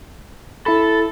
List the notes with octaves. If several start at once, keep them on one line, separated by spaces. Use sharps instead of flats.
E4 A4 B5